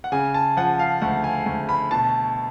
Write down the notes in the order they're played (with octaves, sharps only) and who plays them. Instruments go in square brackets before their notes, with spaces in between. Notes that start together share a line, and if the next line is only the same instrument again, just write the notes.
[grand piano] F#5
C#3 G#5
A5
F3 F#5
F5
D2 F#5
G#5
D2
B5
B2 A5